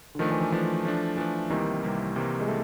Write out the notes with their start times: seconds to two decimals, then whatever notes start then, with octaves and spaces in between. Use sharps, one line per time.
0.15 D3
0.19 D#3 F3 A3 D4
0.31 E3
0.41 E3
0.52 E3 F3 A3 D4
0.85 F3 A3 D4
1.17 E3 F3 A3 D4
1.50 C2 C3 D#3 E3 G3 A#3
1.83 C2 C3 E3 G3 A#3
2.16 C2 C3 E3 G3 A#3
2.40 G#3
2.48 A3